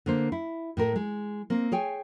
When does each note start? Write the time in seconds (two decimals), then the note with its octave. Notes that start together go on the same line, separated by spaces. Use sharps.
0.06 D3 A#3 C5
0.32 E4
0.77 A2 A3 A#4
0.96 G#3
1.50 A#3 C4
1.72 G#4 C#5 G5 G#5